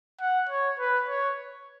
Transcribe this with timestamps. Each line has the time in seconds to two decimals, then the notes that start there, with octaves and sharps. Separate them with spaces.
0.20 F#5
0.49 C#5
0.79 B4
1.08 C#5